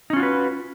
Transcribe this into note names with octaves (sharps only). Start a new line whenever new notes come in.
C#4 D#4 F4 F#4 B4